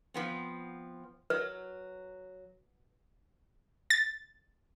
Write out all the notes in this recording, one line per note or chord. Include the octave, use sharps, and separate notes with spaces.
F3 B3 C4
F#3 B4
A6